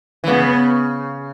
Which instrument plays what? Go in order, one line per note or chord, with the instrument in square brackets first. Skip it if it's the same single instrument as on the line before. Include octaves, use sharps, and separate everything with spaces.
[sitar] E3
[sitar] C#3 [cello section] B3